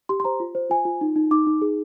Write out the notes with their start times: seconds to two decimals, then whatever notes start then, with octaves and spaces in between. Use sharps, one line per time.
0.09 G4 C6
0.20 C6
0.25 C5 A#5
0.40 F4
0.55 C5
0.70 F4 G#5
0.85 F4
1.01 D#4
1.16 D#4
1.31 D#4 D6
1.47 D#4
1.62 G#4